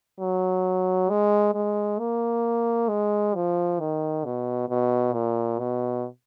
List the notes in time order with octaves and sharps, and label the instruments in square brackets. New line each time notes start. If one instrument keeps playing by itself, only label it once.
[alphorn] F#3
G#3
G#3
A#3
G#3
F3
D#3
B2
B2
A#2
B2